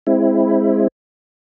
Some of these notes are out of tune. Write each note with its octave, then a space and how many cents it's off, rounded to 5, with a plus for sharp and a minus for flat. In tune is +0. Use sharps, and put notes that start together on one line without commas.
G#3 -5 C4 +10 E4 +0